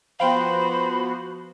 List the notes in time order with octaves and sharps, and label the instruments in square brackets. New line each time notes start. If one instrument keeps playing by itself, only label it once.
[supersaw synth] F3 B3 F#4 [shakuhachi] C5 [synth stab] F5 G5 [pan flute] B5